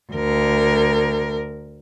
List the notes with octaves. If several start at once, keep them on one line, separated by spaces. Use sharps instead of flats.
D2 A#4